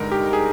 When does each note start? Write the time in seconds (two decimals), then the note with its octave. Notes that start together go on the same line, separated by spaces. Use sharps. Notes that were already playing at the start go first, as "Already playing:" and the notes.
Already playing: G2 D3 G#3 D#4 A#4
0.12 G4
0.33 G#4